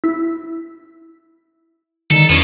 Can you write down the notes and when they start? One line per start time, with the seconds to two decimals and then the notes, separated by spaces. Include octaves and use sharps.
0.04 E4
2.11 D3 D#3 A4
2.29 E2 F3 C#4 C#7